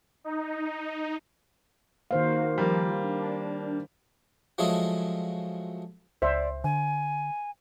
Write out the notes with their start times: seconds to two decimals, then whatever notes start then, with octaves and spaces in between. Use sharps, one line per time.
0.24 D#4
2.11 D#3 A#3 F#4 C5 F5
2.58 F3 G3 A#3
3.04 D4
4.58 F3 F#3 G#3 A3 E4 G#4
6.22 C#2 C5 D5 E5
6.64 D3 G#5